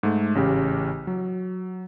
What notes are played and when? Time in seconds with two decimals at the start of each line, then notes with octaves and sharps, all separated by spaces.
0.03 G#2 A3
0.35 A1 C#3 G4
1.07 F#3